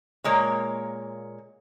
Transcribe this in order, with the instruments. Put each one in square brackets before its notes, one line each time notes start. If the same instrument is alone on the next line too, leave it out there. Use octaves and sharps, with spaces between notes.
[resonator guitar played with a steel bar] A#2 G#3 A#3 C#5